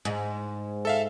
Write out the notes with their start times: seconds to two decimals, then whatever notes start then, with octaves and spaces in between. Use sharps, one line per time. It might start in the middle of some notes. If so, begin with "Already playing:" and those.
0.05 G#2
0.85 A4 E5 F5